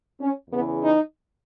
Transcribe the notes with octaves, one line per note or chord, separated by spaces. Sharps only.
C#4
E2 C#3 E3 B3
D#4